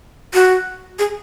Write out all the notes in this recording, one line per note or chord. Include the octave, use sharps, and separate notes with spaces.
F#4
G#4